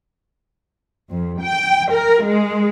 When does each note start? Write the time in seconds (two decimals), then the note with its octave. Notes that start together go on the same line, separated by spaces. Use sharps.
1.10 F2
1.41 G5
1.93 A#4
2.24 G#3